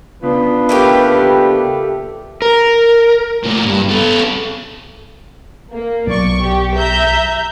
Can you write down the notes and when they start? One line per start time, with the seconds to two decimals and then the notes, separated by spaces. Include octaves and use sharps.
0.23 C#3 B3 D4 F4 B4
0.69 A3 A#3 G4
2.42 A#4
3.44 A2 A#3
3.65 G2
3.89 B3 A4
5.71 A#3
6.07 B1 D5 C#6
6.41 G4
6.75 E5 A#5 G6